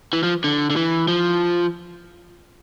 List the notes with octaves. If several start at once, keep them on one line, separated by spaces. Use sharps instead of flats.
E3
F3
D3
D3
E3
F3